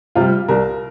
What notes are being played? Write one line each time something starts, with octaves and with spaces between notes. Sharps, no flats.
C3 G3 F4
C2 A#4